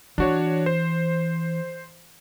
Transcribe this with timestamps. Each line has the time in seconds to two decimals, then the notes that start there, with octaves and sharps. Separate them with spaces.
0.18 E3 D4 F#4 C#5
0.66 C5